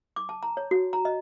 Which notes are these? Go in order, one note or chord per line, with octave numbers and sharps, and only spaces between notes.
D6
A5
A#5
C#5
F#4
A#5
D#5